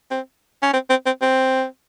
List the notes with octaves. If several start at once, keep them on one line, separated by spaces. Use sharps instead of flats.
C4
C#4
C4
C4
C4
C4